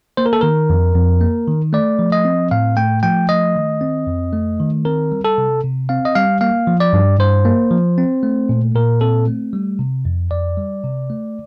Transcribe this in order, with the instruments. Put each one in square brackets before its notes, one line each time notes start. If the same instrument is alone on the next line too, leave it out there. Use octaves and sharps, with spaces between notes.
[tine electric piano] A#3 C5
A#4
A4
D#3 A#4
F2
F2
A#3
D#3
A3 D5
F3
D#5
C4
A2 F5
A3 G5
F3 G5
A3 D#5
D#3
C4
F2
A3
D#3
C4 A#4
G3
A4
C3
C3
C4 F5
D#5
G3 F5
A#3 F5
F3
D5
G2
G2 C5
A#3
F3
C4
A3
A#2
A#2 A#4
C4 A4
A3
G3
C3
F2
F2 D5
G3
C3
A3